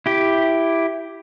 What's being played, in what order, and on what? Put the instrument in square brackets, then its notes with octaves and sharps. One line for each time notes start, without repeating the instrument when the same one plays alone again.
[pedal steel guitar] E4 G4